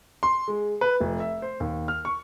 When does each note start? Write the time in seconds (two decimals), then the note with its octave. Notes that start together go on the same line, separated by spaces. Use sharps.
0.23 C6
0.48 G#3
0.81 B4
1.00 F1
1.20 E5
1.42 C5
1.60 D#2
1.88 F6
2.05 C#6